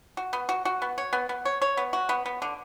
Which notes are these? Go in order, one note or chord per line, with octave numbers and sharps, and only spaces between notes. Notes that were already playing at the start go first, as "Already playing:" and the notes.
F#4
B3
F#4
F#4
B3
C#5
B3
B3
C#5
C#5
B3
F#4
B3
B3
D3